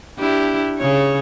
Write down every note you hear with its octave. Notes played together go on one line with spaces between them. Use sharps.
D4 E4 G4
C#3 C#5